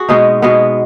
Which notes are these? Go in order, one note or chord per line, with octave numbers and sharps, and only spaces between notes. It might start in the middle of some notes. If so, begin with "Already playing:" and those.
Already playing: F#4 G#4
B2 G#3 B3 D#4
B2 G#3 B3